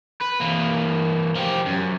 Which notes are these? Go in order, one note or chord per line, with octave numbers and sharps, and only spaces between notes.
B4
E3 A#3
F3 G4
F#2